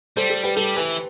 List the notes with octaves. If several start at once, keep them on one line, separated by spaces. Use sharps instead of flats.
G3 A4 C5
A4
G4 B4
G3 A4
E3 G4 B4